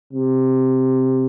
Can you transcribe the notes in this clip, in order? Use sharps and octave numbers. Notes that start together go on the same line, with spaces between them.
C3